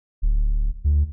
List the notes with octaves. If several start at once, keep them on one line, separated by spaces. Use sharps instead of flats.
D1
D2